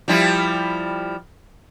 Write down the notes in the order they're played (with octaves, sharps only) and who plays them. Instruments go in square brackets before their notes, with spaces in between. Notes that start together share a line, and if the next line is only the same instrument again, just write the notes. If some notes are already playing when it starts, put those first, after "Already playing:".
[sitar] F3 G3 E4